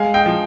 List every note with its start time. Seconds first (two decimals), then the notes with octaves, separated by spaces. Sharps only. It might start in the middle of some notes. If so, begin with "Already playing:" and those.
Already playing: G#3 F5 G#5
0.14 D#5 G5
0.26 F3